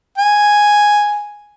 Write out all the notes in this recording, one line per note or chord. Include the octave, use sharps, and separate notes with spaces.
G#5